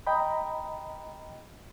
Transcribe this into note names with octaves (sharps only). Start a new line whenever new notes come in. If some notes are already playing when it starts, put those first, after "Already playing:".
D#5 G5 A#5 B5